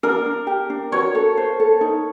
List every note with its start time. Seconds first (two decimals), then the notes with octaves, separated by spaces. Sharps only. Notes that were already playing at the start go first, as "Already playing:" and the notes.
0.03 D4 A#4
0.26 D4
0.47 G4
0.70 D4
0.92 F#4 C#5
1.15 A4
1.37 C5
1.60 A4
1.81 D#4